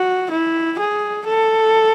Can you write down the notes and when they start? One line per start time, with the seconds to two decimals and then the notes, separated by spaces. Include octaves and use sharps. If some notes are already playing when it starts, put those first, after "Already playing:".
Already playing: F#4
0.31 E4
0.80 G#4
1.28 A4